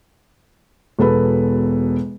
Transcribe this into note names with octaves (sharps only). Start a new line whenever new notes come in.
E1 B2 A4 B4 B5